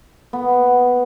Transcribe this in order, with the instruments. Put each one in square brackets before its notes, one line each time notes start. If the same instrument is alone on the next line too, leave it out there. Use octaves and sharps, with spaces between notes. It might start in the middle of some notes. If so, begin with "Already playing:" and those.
[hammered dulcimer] B3